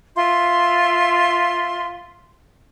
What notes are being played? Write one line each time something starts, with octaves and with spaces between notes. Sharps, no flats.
F4 E5 C6